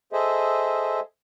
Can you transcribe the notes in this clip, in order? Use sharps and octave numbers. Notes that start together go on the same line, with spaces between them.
G#4 A4 C5 D#5 E5